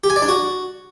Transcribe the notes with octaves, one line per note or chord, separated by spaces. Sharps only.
G4
G#5
D5
D4
F#4